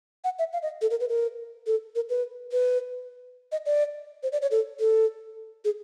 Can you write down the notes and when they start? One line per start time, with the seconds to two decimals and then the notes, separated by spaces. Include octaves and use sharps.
0.24 F#5
0.39 E5
0.53 F5
0.62 D#5
0.82 A4
0.91 A#4
1.00 B4
1.09 A#4
1.67 A4
1.95 A#4
2.10 B4
2.52 B4
3.52 D#5
3.66 D5
4.23 C5
4.32 D5
4.42 C#5
4.51 A4
4.80 A4
5.65 G#4